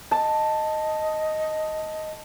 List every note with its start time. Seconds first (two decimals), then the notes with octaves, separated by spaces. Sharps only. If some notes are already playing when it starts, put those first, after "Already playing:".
0.11 D#5 A5